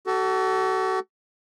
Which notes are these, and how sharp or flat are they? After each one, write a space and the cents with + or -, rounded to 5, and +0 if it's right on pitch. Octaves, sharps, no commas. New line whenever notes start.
F#4 +35 A4 +5